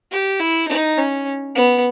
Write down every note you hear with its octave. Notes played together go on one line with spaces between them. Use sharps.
G4
E4
D#4
C#4
B3